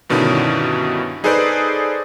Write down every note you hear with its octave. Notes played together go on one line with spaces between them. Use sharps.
G2 B2 D3 D#3 C#4 E4
D#4 G#4 A4 B4 C5 D5